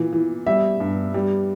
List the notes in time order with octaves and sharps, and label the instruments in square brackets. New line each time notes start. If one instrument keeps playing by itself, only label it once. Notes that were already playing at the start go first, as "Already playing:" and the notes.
Already playing: [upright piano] A#2 E3
E3
G3 E5
G2
G3